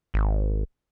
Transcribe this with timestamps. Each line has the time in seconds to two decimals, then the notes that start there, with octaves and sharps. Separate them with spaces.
0.14 G#1